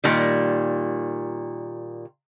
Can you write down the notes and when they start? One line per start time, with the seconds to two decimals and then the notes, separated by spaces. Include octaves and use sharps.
0.04 A#2 D#3 G3